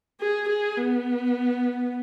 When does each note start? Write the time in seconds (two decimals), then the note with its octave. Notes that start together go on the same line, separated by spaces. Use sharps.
0.21 G#4
0.49 G#4
0.77 B3